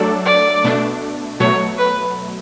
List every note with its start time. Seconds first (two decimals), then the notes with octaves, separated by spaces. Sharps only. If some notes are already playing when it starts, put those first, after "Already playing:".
Already playing: F#3 A3 D4 A4 D5
0.25 D5
0.64 B2 A3 D4
1.40 B2 F#3 A3 C#5
1.78 B4